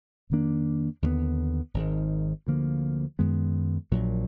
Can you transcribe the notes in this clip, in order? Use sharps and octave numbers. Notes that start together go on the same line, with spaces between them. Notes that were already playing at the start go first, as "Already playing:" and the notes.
F2 D#3 A#3 D4
D#2 D3 F#3 B3
G#1 G#2 D#3
D2 D3 F3 A#3
F#2 D#3 G#3 B3
A#1 A#2 F#3